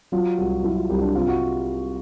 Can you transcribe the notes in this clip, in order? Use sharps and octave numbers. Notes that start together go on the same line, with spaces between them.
F#3 F4
C2 F#4
F#3 E4
F4
C2 G4
D4
C3 F4
F#4